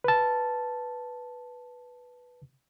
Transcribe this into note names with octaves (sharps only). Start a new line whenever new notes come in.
B4 A5